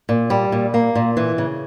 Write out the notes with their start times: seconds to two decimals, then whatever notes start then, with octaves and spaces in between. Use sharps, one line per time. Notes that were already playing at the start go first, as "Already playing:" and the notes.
0.09 A#2
0.30 G3
0.52 A#2
0.74 A#3
0.95 A#2
1.17 E3
1.38 C#3